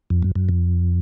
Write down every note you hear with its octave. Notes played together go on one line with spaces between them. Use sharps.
F2
F#2
F#2
F2